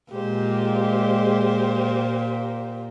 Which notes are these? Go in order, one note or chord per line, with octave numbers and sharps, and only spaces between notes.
A#2 G#3 G4 C5